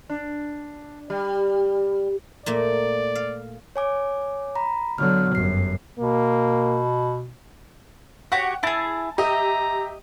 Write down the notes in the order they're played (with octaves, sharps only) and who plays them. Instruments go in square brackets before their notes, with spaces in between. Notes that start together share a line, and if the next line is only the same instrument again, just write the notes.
[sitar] D4
G3
[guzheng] A#2 A3 A#3 [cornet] D5
[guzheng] F5
[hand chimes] C#5 G#5 D6
A#5 B5
[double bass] D3 F#3 [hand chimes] B3 F#4 F6
[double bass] G1 F#2 [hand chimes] C7
[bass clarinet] B2 [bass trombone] A#3
[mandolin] F#4 G4 C#5 [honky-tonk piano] F#5
[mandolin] E4 G#4 [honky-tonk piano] A5 A6
[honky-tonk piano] G4 E5 [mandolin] D#5 [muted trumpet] A#5